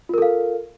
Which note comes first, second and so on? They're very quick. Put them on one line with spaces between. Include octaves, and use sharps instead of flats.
F4 A#4 A4 F5